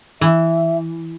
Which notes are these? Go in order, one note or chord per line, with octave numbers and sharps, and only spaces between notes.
E3 E5